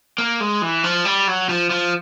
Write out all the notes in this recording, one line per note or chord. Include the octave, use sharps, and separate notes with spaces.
A#3
G#3
E3
F3
G3
F#3
F3
F3